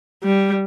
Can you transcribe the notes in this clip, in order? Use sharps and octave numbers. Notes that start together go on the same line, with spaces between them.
G3